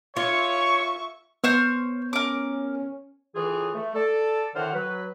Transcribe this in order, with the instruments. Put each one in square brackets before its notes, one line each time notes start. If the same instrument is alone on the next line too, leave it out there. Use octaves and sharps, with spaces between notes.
[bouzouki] F4 [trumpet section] C#5 [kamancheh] E5 C#6
[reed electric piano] B3 [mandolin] C5 C#5 F6
[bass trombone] C#4 [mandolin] A#4 D6
[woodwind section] C#2 A2 E3 F4 G#4
A3
A4 D5
A2 D3 D#3 C5 F#5 F6
F#3 B4